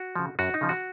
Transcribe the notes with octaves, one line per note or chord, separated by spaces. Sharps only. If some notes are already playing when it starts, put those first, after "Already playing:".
Already playing: F#4
C#3 F3
F#2 F#4
D#4
C#3 F3
F#4